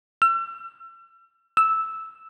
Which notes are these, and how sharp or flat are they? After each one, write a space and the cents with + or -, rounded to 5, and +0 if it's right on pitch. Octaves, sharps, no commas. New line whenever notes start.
E6 +40
E6 -10